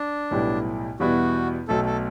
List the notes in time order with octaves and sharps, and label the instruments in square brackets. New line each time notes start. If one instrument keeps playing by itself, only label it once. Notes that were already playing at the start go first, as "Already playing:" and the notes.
Already playing: [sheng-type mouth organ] D4
[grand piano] B1 A2 G3 B3 E4
[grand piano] E2 B2 G3 B3 E4 [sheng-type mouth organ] F#4
[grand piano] B1 B2 A3 [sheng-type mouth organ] A4
[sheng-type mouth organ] A4